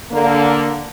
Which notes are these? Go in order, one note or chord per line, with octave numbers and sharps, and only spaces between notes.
D3 A#3